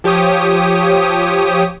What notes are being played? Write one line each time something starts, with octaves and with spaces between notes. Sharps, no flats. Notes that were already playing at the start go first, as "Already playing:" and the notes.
F3 G4 C#5 D#6